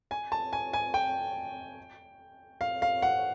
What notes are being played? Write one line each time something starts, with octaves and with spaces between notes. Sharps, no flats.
G#5
A5
G#5
G#5
G5
F5
F5
F#5